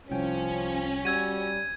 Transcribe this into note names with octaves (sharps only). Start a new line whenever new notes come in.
C2 F3 C#4 G5
G3 F#4 E6 G#6 D#7